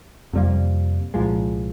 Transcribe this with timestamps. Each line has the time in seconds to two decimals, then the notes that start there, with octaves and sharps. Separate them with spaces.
0.33 F2 C3 G3 A#3
1.14 C2 A#2 F3 G#3